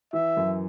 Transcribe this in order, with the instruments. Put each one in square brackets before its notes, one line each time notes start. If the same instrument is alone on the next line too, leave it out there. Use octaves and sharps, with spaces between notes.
[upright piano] E3 [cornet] E5
[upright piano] F#2